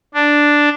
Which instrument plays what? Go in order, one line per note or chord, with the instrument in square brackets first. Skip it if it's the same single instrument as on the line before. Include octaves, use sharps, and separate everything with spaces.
[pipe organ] D4